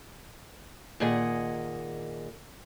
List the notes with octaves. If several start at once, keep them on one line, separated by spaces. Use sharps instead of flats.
A#2 D#3 G#4 D#5 F#5